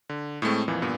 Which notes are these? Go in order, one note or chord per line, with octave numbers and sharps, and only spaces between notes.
D3
A2 G#3 A3 C4
F2 A#2 E3 F3
G2 A#2 B3